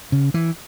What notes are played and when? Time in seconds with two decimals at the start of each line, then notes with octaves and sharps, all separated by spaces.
0.12 C#3
0.34 E3